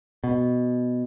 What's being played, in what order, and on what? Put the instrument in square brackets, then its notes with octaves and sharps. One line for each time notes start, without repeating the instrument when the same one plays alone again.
[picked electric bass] B2